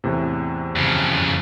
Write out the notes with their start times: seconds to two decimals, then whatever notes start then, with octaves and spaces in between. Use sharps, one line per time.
0.04 E2 A2 C3
0.76 F2 C#3